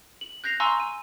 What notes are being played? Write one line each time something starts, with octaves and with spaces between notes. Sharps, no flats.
F#7
F#6 G6 A#6 C7 F7
F5 G#5 A#5 C6 C#6 E6
D#7